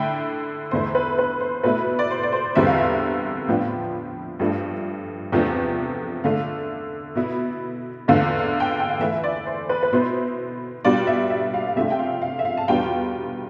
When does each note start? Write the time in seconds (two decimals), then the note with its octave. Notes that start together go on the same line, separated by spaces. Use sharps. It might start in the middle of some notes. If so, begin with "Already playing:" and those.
Already playing: D3 A3 E4 G5
0.71 E2 D3 A3 E4 C5
0.95 B4
1.18 B4
1.40 C5
1.63 B2 A3 E4 B4
1.99 D5
2.10 C5
2.23 D5
2.32 C5
2.55 E2 D3 G3 C4 E4 E5
2.67 F5
2.78 E5
3.48 A2 F3 B3 D4 F4
4.39 G2 F3 A3 D4
5.32 E2 C3 F3 A3 D4
6.24 D3 A3 D4 F5
7.15 B2 B3 E4
8.08 E2 D3 A3 D4 F4 F5
8.39 F5
8.60 G5
8.70 F5
8.80 G5
8.89 F5
9.00 E3 A3 E4 E5
9.24 D5
9.46 C5
9.69 B4
9.83 B4
9.92 B2 B3 E4 C5
10.84 B2 G3 D4 F4 D5
11.07 E5
11.30 E5
11.54 F5
11.68 F5
11.76 C3 F3 A3 D4 F4 E5
11.90 G5
11.99 F5
12.22 F5
12.39 E5
12.45 F5
12.57 A5
12.68 E2 B2 G3 D4 F4 G5